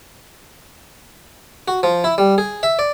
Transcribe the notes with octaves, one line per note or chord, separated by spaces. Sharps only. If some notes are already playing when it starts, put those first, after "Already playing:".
F#4
F3
E4
G3
G#4
E5
D5